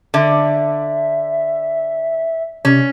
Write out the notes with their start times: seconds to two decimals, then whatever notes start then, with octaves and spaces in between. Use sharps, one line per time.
0.14 D3 E5
2.65 C3 C#4